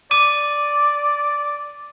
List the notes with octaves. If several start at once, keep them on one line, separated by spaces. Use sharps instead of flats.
D5 D6 D#7